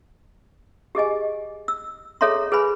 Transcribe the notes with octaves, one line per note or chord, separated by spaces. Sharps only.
G4 G#4 D#5 G#5
E6
G#4 A4 C#5 E5 A#5 C6
G#4 B4 C5 G#5 B5